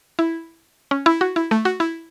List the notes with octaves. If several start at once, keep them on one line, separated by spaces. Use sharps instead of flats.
E4
C#4
E4
F#4
E4
A3
F#4
E4